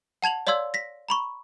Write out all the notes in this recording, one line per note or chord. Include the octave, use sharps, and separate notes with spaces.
F#5 A5 G#6 F7 F#7
C#5 D5 F5 C6 E6 G#6
A#6 B6
A#5 B5 C#6